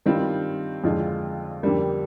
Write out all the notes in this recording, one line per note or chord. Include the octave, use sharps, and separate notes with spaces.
G2 D#3 G3 C4 F4
F2 D3 G#3 D4 F4
F2 D3 G3 A#3